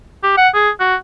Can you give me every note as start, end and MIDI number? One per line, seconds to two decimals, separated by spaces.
0.23 0.36 67
0.37 0.48 78
0.54 0.70 68
0.80 0.95 66